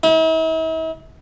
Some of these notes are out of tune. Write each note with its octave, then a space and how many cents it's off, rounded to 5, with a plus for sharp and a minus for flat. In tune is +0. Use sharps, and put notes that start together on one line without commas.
E4 -45